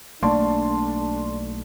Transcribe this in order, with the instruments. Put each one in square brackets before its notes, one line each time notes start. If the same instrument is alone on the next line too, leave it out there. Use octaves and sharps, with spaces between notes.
[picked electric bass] B1 A3 A#3 [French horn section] D4 [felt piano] D5 A5 C6